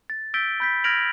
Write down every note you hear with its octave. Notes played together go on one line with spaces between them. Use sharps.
A6
E6 G6 A6 B6 D7 G7
B5 G6 B6
F6 G#6 A#6 D7 F7 F#7